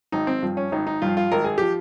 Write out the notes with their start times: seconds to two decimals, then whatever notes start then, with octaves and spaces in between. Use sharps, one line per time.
0.12 G#1 D#4
0.27 C4
0.43 G2 F3
0.57 C#4
0.72 G#1 D#4
0.87 D#4
1.02 G2 F3 F4
1.17 F4
1.32 G#1 A#4
1.44 G#4
1.58 F3 G4